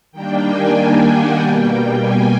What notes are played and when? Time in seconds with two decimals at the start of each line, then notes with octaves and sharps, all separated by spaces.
0.12 D#3 G3 A#3 D4 G5
0.44 G#5
0.75 G5
1.07 F#5
1.38 B2 G3 A#3 G5
2.01 G#5